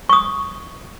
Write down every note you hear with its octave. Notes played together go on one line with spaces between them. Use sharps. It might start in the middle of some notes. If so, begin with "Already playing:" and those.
C#6 D#6